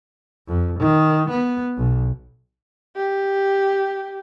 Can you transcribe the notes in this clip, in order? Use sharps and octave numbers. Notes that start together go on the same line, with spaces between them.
F2
D#3
B3
B1
G4